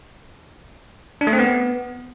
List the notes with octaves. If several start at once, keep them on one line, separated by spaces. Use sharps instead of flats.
D4
A3
C4
B3